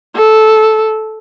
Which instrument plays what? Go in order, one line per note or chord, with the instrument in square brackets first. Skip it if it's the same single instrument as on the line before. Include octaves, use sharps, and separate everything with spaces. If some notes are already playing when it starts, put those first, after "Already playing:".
[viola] A4